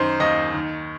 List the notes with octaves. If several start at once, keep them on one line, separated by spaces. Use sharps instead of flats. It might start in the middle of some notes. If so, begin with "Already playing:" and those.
Already playing: F#2 D#3 C5
D#2 D#5
D#3